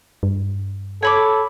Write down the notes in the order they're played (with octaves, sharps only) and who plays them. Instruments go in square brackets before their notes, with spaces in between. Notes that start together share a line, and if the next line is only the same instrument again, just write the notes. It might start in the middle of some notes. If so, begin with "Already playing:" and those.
[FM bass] G2
[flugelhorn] A4 [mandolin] C#5 B5 D6